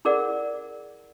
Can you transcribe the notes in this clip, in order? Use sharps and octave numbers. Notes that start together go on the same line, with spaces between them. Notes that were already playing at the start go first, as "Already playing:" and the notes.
E4 G#4 A#4 D5 F#5